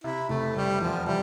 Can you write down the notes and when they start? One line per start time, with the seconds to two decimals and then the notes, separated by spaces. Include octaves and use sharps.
0.04 C3 E4
0.29 F1 A3
0.56 F1 G3
0.81 E2 F3
1.06 C3 G3